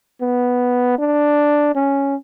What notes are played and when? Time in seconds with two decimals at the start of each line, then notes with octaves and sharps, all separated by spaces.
0.21 B3
0.99 D4
1.75 C#4